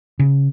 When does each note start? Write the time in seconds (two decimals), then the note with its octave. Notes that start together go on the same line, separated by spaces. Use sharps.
0.19 C#3